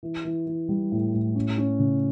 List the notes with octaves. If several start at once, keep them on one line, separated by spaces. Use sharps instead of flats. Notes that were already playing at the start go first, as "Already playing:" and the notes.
E3
E3
E3
G3
A2
A2
C#4
C#4
C#3